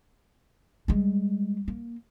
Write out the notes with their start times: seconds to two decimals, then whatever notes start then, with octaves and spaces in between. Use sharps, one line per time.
0.88 G3 G#3
1.68 A#3